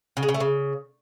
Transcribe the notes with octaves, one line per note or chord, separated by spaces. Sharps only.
C#3
G#3
C#3
A3
C#3